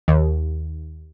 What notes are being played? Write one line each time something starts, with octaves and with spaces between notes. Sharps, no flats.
D#2